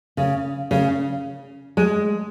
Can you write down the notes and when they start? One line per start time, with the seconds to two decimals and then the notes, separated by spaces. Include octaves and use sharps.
0.17 C#3
0.71 C#3
1.77 G#3